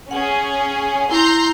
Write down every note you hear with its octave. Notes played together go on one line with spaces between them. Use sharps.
C#4 G#4 F#5
E4 A#5 C6 G6